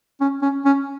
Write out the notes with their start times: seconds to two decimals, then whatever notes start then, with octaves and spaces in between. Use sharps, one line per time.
0.21 C#4
0.42 C#4
0.65 C#4